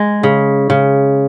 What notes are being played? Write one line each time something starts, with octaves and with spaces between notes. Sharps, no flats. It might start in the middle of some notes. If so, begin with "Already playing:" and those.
Already playing: G#3
C#3
C#3